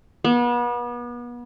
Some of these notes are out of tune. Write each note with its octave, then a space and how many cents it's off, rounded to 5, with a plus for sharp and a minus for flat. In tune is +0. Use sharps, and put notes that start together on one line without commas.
B3 -35